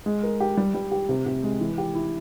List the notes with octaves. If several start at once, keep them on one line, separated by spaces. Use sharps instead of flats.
G#3
A#4
G4
G3
G3
G4
C3
C3
G#3
E3
G4
E4